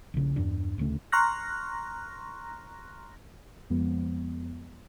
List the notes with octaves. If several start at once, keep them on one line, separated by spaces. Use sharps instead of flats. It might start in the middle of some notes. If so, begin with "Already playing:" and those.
A#1 C#3
E2 G2 D4
D1 D2 C#3 A3
A#5 C6 C#6 F6 F#6 A#6
F2 F3 G#3 B3